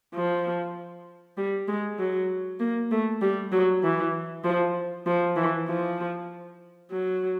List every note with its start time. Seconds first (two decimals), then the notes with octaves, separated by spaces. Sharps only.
0.14 F3
1.38 G3
1.68 G#3
1.99 F#3
2.60 A#3
2.92 A3
3.22 G3
3.52 F#3
3.83 E3
4.45 F3
5.06 F3
5.37 E3
5.69 F3
6.91 F#3